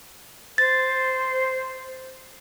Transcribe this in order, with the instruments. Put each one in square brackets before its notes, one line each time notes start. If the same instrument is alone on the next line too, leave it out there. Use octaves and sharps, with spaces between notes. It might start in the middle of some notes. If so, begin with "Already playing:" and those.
[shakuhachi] C5 [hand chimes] A6